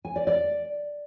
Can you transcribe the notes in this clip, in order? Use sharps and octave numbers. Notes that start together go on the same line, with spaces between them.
G#5
D5
D5